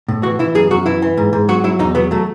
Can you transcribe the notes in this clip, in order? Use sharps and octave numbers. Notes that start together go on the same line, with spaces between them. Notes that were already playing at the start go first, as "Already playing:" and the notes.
A2
E3 F#4
E3 E4
F#2 G#4
F#2 F#4
E3 E4
E3
G#2
G#2
F#3 F#4
F#3 E4
E2 D#4
F#3 B3
F#3 A3